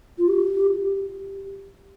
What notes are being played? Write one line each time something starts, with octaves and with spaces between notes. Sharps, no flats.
F4
G4